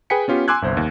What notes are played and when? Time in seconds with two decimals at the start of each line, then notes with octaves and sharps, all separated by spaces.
0.10 G#4 B4 G5 G#5 B6 C#7
0.28 B3 C#4 F4 G4
0.48 G#5 C6 D6 E6 F#6 G#6
0.62 G1 C2 C5
0.77 D#2